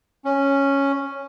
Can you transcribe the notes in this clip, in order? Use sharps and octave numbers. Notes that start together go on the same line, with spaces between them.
C#4